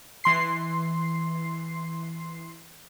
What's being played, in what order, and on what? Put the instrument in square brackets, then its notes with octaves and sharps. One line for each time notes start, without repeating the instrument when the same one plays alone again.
[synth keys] E3 C6 C7